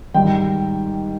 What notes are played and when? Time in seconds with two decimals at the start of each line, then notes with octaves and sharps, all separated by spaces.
0.14 G#2 D#3 G3 G5